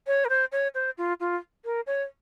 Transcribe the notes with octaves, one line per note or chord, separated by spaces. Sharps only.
C#5
A#4
C5
C#5
C5
F4
F4
A#4
C#5